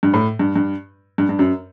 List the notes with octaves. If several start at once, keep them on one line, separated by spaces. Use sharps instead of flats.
G2
A2
G2
G2
G2
G2
F#2